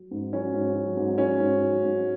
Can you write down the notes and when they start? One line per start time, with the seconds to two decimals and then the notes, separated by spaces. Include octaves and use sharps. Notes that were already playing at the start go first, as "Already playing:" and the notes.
Already playing: F#3
0.11 G#2
0.33 F#3 C#4
0.54 G#2
0.75 F#3
0.97 G#2
1.18 F#3 C#4
1.40 G#2
1.61 F#3
1.83 G#2